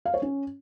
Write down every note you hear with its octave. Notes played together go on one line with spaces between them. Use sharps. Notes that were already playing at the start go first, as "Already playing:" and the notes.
F5
C#5
C#4